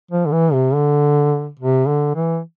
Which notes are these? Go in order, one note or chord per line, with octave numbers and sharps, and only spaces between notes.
F3
D3
E3
C3
D3
C3
D3
E3